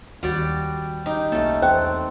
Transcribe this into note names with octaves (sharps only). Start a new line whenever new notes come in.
D#2 G3 F#4 G4 D5
D#4 G4
B1 A3 A#3 C#4 A4
E2 C4 C5 G5